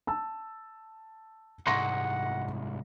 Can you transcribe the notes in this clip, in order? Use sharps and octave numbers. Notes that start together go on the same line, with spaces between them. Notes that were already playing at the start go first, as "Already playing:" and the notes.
A5 E6
C2 G#2 F#5 C6 C#6 A#6